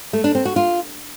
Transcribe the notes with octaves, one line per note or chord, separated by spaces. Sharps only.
A3
D4
C4
F#4
F4